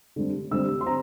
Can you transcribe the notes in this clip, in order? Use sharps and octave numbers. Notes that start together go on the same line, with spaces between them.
D3 G3 C4
D3 G3 C4 E6
C6
C4 A#5